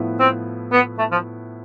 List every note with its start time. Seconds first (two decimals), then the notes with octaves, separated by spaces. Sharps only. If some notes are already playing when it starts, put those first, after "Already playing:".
Already playing: A2 F3 B3 E4 B4
0.20 C4
0.72 B3
0.98 A3
1.12 F3